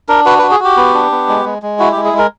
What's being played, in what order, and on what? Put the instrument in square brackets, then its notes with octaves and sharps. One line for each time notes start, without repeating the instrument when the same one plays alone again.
[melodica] D4 A#4
F#4 B4
B4
F#4
G#4
F#4 G4
B3
D4
B3
G#3
G#3
G#3
E4 F#4
G4
G#3
G#4
G#3
A#4